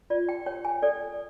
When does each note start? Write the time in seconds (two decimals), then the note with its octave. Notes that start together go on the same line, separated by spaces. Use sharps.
0.10 F4 D5
0.29 G5
0.46 C#5 G5
0.65 G#5
0.82 A4 D5